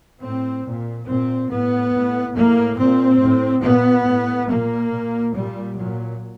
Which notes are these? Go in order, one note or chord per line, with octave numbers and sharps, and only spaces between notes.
A2 C4
A#2
A#2 C4
A2 B3
A2
A2 A#3
A#2 C4
A2
A#2 B3
A2
A#2 A#3
A#2
A#2 G3
A#2 F#3